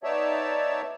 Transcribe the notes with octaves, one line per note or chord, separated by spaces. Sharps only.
B3 D#4 C#5 D5 E5 A5